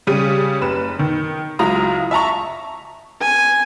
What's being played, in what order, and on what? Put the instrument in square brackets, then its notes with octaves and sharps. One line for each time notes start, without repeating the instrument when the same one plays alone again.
[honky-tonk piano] C#3 G3 D#7
F#1 B4 E7
D#3
C#2 F#3 E4 F4 A#5 D#6
E5 A5 A#5 C#6
[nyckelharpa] G#5